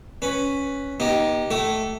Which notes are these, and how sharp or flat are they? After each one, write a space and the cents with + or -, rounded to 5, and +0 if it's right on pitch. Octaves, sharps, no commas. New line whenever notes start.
C#4 +0 B4 +0
B3 -40 D#4 +5 G4 -5
A3 +0 G4 -40